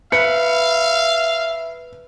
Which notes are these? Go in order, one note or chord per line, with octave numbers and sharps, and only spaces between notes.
B4 E5 F5 C#7